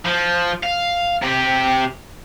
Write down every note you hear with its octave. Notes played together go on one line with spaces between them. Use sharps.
F3
F5
C3 G4